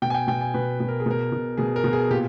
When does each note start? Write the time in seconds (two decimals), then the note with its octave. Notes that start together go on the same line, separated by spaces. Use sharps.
0.02 B2 G5
0.10 G#5
0.15 G5
0.28 B2 G5
0.41 G#5
0.54 B2 B4
0.80 B2
0.88 A#4
1.00 G#4
1.06 B2 A#4
1.32 B2
1.57 B2 G#4
1.76 A#4
1.84 B2
1.93 G#4
2.10 A#2 G4